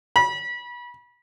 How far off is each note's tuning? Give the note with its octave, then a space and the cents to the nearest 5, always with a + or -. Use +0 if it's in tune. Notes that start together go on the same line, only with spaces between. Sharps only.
B5 -30